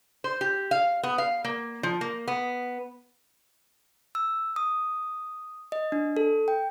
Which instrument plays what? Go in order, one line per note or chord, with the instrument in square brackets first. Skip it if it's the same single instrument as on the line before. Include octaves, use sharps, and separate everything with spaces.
[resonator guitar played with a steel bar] C5
G4
F5
B3
F5
A#3
F3
A#3
B3
[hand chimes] E6
D#6
D#5
D4
A4
G5